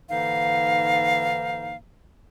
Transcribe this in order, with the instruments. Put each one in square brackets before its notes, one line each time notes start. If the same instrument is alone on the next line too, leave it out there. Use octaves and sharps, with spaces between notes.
[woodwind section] G#2 D3 E3 A#3 D#4 F5